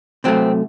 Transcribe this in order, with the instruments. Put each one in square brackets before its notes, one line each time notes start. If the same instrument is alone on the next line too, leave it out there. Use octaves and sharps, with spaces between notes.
[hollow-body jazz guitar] C3 F#3 A3 C4